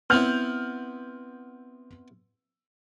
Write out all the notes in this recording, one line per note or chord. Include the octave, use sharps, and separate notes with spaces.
B3 C4 E4 F6 G6 F7